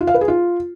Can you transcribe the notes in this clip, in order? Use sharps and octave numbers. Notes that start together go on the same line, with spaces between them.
F4
F5
B4
G#4
F4